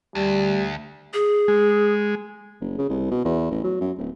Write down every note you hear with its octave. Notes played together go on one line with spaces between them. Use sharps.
D2 G3
G#4
G#3
F#1
C#3
C2
B2
E2
A1
F#3
F#2
D1